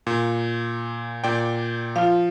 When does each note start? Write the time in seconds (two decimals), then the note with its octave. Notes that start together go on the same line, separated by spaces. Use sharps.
0.07 A#2
1.24 A#2 D5 G5
1.96 F3 F4 F5